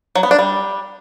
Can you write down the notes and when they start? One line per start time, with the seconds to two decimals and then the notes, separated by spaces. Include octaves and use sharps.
0.15 F#3
0.23 B3
0.31 D4
0.39 G3